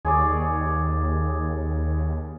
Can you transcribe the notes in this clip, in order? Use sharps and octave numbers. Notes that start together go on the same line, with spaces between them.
D#2 G#4 C#5 D5